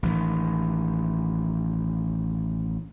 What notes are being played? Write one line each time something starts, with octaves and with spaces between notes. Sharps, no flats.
A1 D#3